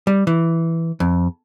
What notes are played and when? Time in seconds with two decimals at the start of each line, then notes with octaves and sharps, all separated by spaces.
0.07 G3
0.27 E3
1.00 F2